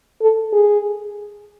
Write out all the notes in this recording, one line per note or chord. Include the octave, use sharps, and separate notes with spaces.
A4
G#4